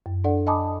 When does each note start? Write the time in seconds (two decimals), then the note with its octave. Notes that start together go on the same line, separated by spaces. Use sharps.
0.06 F#2
0.24 D4 A4 D5 F#5
0.47 D#5 G#5 A5 B5 D6 D#6